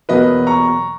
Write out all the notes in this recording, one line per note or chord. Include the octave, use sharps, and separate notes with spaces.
E2 B2 F#3 A#3 B4 D#5
A#5 C#6